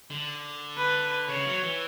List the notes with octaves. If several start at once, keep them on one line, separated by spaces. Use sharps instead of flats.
D3
B4
C#3 C#5
F#3
E3